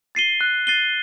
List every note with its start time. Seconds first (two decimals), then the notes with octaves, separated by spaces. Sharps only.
0.15 A6 C7 D#7 G7
0.41 F#6
0.67 A6 C7 D#7 G7